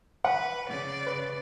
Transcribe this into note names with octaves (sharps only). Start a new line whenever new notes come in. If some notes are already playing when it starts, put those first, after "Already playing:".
B4 F#5
C#3 D5
B4